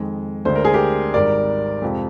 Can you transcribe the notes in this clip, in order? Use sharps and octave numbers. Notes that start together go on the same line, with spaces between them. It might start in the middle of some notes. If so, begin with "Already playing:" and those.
Already playing: F2 D#3 G#3
D2 D3 G#3 C5
A#4
G#4
G4 A#4
G#1 G#2 G3 A#4 D5
F2 C3 F3 G#3